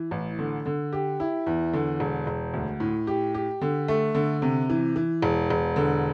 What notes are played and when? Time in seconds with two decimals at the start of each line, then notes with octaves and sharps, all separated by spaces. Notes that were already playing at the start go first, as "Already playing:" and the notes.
Already playing: E3
0.11 A1
0.39 D3
0.66 D3
0.93 G4
1.20 E4
1.46 E2
1.73 D3
2.00 E1
2.27 E1
2.54 D2
2.80 A2
3.07 G4
3.35 G4
3.61 D3
3.88 A3
4.15 D3
4.42 C3
4.70 E3
4.96 E3
5.22 E1
5.50 E1
5.76 D3